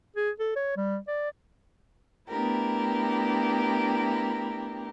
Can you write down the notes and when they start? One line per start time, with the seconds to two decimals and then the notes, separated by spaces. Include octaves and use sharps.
0.16 G#4
0.39 A4
0.56 C#5
0.77 G3
1.08 D5
2.30 A3 B3 D4 E4 G4 A#4